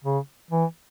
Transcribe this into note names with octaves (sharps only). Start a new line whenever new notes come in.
C#3
E3